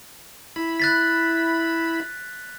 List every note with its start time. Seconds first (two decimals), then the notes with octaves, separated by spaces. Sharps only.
0.56 E4 B5
0.80 F#6 A6 B6